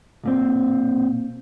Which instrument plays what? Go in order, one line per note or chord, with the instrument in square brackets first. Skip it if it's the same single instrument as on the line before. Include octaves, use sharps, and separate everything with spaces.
[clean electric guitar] B1 A#2 C4